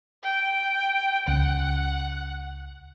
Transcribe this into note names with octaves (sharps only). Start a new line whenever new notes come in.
G5
C#2 F#5